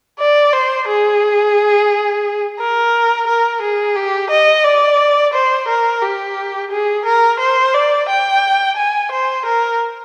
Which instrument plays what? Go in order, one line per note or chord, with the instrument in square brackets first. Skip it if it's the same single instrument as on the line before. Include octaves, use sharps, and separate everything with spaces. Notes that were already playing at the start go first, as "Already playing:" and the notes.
[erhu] D5
C5
G#4
A#4
A#4
G#4
G4
D#5
D5
C5
A#4
G4
G#4
A#4
C5
D5
G5
G#5
C5
A#4